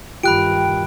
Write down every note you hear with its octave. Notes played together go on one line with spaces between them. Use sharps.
G2 D#3 F4 G4 G5 B5 F#6 D7